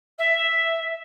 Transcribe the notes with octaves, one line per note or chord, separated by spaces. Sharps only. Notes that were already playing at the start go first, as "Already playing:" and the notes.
E5